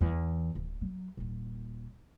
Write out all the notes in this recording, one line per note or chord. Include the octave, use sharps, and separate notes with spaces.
E2 E3
D1
F#3
D#1 A#2